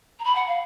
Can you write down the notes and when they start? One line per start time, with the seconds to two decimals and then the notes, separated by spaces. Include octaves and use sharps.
0.19 A#5
0.24 B5
0.35 F#5
0.47 F5